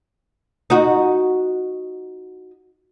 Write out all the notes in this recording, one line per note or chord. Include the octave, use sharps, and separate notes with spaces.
D#4 F#4